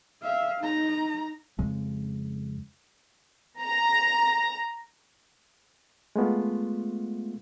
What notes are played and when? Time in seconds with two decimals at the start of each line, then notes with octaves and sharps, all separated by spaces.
0.22 E5 F5
0.60 D#4 A#5
1.59 F2 C#3 G#3
3.62 A#5
6.16 G#3 A3 B3 F4